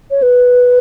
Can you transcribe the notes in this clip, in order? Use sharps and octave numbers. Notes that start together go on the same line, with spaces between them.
C#5
B4